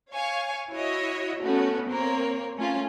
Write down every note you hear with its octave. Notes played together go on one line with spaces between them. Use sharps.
C#5 F5 G#5 C#6
E4 F#4 C#5 D#5 E5
A3 B3 C#4 F#4
A#3 C4 A#4 C#5
A3 C#4 F4